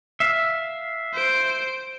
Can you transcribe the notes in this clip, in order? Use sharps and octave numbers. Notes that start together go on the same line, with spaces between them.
E5 F5
C5 D7